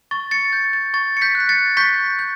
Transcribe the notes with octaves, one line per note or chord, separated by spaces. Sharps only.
C#6 A6
A6 C#7
G6 A6
A6
C#6 A6
C#7
G6 B6
F#6
B6
A6 C#7
C#6 G6 B6
G6